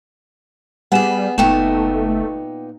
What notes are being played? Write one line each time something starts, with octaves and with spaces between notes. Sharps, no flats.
G3 B3 G#4 F#5 G#5 E7
F#1 A#2 A3 B3 D#4 G5 E7